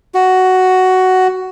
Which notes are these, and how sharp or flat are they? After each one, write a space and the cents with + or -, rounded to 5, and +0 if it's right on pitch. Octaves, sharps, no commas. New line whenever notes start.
F#4 +10